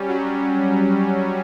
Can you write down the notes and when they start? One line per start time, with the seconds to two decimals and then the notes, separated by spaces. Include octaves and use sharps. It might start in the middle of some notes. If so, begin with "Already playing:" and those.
Already playing: G3 C#4
0.08 F#3